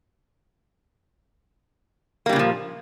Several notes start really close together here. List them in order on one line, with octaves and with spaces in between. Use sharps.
A#3 G3 C#3 A#2 F3